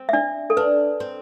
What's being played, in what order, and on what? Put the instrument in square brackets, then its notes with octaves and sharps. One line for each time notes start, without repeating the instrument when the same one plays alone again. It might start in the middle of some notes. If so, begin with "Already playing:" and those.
Already playing: [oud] C4
[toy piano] E5
D4 D5
A4
[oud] D4 [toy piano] B4
[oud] C4